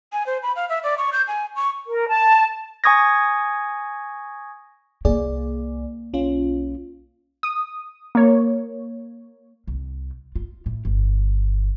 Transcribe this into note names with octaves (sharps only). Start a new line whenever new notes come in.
G#5
C5
B5
F5
E5
D5
C#6
G6
G#5
C#6
A#4
A5
G#5 C#6 D#6 G#6 A#6
C2 A#3 G#4 D5
B1 C#4 F4
D#6
A#3 C#5
C2
F4
A2
G1